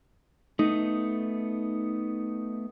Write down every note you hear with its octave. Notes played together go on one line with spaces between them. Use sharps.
A3 B3 D#4